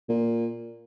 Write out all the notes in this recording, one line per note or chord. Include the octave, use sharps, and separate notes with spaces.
A#2